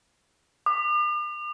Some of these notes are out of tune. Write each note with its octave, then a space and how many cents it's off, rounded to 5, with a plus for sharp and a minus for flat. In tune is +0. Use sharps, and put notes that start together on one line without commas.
D6 +45